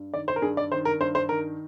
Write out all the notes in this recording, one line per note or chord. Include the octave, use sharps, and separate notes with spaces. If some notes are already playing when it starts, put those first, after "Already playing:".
Already playing: G2
D#3 D5
C5
A#4
G2 G#4
D5
D#3 C5
A#4
G2 C5
C5
D#3 A#4